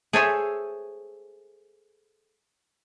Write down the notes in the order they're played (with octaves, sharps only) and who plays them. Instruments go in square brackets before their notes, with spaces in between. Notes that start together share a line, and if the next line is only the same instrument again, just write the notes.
[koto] G#4 A4 C5 C#5 E5 G#5